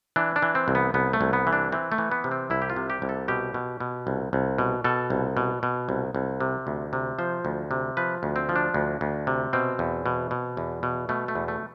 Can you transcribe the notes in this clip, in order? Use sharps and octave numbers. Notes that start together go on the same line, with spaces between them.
E3 D4
D4
E3
C4
C2
B3
C2 B3
A3
C2
B3
E3
D4
E3 C4
A3
E3
B3
C3
C4
C2 E4
G4
F4
C3
G4
C2
A4
B2 G4
B2
B2
C2
C2
B2
B2 A4
C2
B2
B2
C2
C2
C3
D2
C3
F3 C5
D2
C3
F3 B4
D2
C4
F3
D4
D2
D2
C3
B2 C4
E2
B2
B2
E2
B2
B2 A3
A3
E2
A3